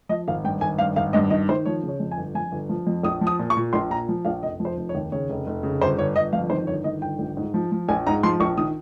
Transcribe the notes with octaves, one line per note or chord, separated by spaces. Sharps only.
F3 D#5
G#1 F5
G2 G5
G#1 G#5
G2 F5
G#1 F5
G2 D#5
D#3 D#5
D#3 C5
F3 C#5
C#3
C#5
F2
G#5
G1
F2 G#5
G1
F3
F2
A#1 D#6
F3
D#6
A#2
C#6
A#2
A#1 C6
A#2 A#5
F3
A#1 F5
F1 D#5
F3
C5
F1
C#5
D#2
C#3 C#5
F1
F1
C#3
G1 C5
G1 C#5
G1 D#5
F2 F5
D#3 C5
G1 C#5
D#3 D#5
G1 G5
A#1
G#2
F3
F3
A#1 G#5
G#2 A#5
F3 C6
A#1 C#6
D#3 D#6